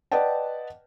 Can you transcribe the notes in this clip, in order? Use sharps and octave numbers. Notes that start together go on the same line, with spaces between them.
B4 D5 D#5 F#5 G5 A5